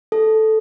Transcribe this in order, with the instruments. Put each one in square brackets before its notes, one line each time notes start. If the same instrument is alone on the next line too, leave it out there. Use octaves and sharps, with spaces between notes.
[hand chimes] A4